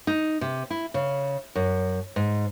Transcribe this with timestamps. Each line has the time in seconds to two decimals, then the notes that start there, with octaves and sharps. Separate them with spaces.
0.07 D#4
0.41 C3
0.70 E4
0.94 C#3
1.55 F#2
2.16 G#2